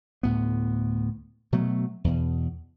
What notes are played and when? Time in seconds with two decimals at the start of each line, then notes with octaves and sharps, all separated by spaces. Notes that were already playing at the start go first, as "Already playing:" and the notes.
0.23 D2 A2 B3
1.53 B2 F#3 A3
2.04 E2 B2